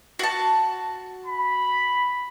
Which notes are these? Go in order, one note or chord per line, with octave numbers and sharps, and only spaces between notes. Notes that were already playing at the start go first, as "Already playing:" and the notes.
F#4 A5
B5